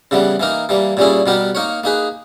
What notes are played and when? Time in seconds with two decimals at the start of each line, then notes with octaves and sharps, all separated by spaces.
0.11 C#3 E3 G3 B3
0.40 E3 A#3 D#4 A#4
0.69 E3 G3 A#3
0.97 A#2 G3 C#4 E4 G#4
1.26 B2 G3 B3 G4 A#4
1.55 A#3 D#4 A#4 C#5
1.84 A#3 D#4 G#4 B4